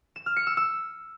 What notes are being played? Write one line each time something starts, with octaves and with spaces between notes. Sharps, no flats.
E7
F6
C#7
E6
E6